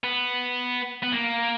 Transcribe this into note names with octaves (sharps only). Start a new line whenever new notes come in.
B3
B3
A#3